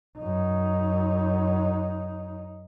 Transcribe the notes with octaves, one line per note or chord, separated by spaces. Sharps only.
F#2 D#4